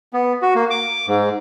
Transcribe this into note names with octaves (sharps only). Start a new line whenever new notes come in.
B3
F#4
A#3
D6
G#2